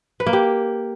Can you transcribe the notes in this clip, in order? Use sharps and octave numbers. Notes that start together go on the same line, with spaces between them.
B4
A#3
G4